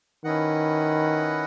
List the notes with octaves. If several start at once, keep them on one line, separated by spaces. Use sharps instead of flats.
D#3 C#4 E4 B4 D#5 F#5